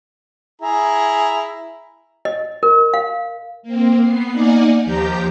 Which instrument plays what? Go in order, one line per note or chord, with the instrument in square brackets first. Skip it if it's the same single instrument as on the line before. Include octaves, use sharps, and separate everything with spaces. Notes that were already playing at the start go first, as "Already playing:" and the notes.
[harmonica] E4 G#4 A#5
[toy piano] D#5
A#4
F5
[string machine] A#3 C4
B3 C7
A#3 D#4 D5 F#5 G#5
D#2 F3 G4 A#5 G6